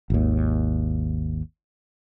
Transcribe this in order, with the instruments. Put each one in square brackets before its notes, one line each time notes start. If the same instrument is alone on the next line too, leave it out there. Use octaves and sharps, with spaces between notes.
[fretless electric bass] G#1 D#2